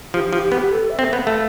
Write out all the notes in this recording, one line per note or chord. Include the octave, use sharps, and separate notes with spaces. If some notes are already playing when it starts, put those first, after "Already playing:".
F3 G4
F3 G4
B3 G4
A4
E5
C4
B3 F5
A3